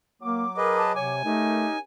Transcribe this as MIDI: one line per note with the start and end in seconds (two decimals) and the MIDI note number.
0.22 1.14 54
0.22 0.45 58
0.22 1.14 86
0.57 0.92 68
0.57 0.82 70
0.57 0.92 71
0.57 0.92 75
0.77 0.93 81
0.96 1.22 48
0.96 1.22 73
0.96 1.79 80
1.24 1.67 57
1.24 1.78 61
1.24 1.77 63
1.24 1.78 67
1.24 1.78 70